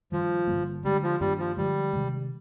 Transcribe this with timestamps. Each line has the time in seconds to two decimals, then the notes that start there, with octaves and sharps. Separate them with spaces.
0.12 G2 D#3 F3 G3
0.47 G2 D3 G3 A#3
0.84 D3 G3 G#3 D4
1.03 F3
1.21 G2 D#3 G3 A#3 D4
1.39 F3
1.57 D3 F3 G3 G#3
1.93 C3 D#3 G#3